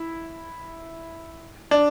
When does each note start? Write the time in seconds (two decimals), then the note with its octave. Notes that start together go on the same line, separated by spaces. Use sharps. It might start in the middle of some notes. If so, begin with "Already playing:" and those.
Already playing: E4
1.71 D4